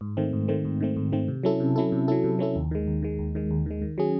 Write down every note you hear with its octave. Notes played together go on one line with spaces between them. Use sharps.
G#2
D#3 A3 C4
G#2
D#3 A3 C4
G#2
D#3 A3 C4
G#2
D#3 A3 C4
C3
F#3 C#4 E4 A4
C3
F#3 C#4 E4 A4
C3
F#3 C#4 E4 A4
C3
F#3 C#4 E4 A4
D#2
D#3 G#3
D#2
D#3 G#3
D#2
D#3 G#3
D#2
D#3 G#3
D#3
F#3 C#4 G#4